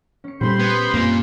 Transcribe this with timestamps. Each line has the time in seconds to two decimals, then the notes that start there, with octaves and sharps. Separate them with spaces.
0.24 C#4 C#7
0.41 A#2 G3 C4 C#4 C5 B5 C6
0.59 B3 G#6 A6 B6
0.94 F#2 A#2 A#3 C4